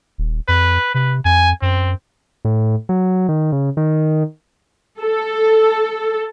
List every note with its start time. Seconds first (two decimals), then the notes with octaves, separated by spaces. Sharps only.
0.18 D#1
0.48 F2 B4
0.94 C3 B4
1.25 F2 G#5
1.62 F#2 C4
2.45 A2
2.89 F#3
3.29 D#3
3.52 C#3
3.77 D#3
5.01 A4